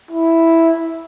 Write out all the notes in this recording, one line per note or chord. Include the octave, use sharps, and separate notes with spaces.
E4